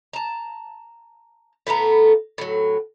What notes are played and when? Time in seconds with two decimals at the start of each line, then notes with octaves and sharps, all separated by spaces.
0.13 A5 A#5
1.67 A2 A3 B3 A#5
2.38 A2 F#3